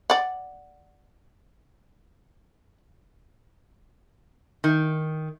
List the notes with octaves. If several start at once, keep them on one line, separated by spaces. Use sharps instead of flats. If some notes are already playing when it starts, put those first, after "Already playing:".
D5 F#5
D#3